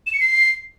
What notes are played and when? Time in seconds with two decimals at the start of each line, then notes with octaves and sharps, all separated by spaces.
0.06 E7
0.13 C#7
0.20 C7